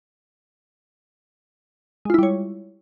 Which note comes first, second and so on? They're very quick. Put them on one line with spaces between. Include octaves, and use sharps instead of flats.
G#3 F4 E4 G3 C#5